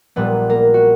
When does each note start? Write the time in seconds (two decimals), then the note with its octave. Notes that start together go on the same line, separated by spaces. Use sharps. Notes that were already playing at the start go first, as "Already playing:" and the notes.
0.16 A#1 A#2 G3 B3 B4
0.49 A#3 A#4
0.74 F#4